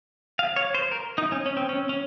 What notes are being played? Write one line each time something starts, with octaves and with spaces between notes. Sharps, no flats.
F5
C#5
C5
A#4
D#4
C#4
C#4
C4
C#4
C#4